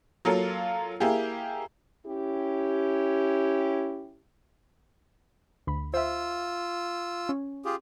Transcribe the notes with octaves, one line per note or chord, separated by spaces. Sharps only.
F#3 A#3 F4 A4
A#3 E4 G4 G#4
C#4 E4 G4
D2 B5
F4 C5 E5 E6
C#4
F4 G4 G#4